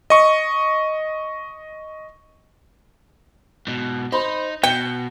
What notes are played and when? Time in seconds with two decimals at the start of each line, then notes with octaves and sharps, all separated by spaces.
0.10 D#5 C#6
3.67 G#2 B2
4.12 D#4 C5 B5
4.63 B2 G5 C#7